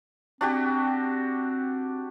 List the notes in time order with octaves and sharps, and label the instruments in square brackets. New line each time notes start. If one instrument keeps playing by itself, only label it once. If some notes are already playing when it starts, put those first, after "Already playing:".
[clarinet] C4 [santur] D4 F#4 G4